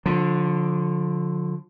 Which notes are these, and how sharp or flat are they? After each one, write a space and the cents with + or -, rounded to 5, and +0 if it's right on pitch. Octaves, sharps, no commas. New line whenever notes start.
D3 +0 F3 +35